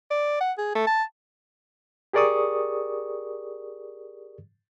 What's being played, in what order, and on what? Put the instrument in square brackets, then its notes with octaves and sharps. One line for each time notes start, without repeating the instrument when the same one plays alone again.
[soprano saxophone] D5
F#5
G#4
A3
A5
[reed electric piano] G4 G#4 A#4 D5 C#6 D#6